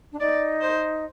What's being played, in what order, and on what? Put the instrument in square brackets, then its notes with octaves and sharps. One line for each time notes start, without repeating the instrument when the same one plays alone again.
[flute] D4
[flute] D#4 [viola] D5
[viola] C5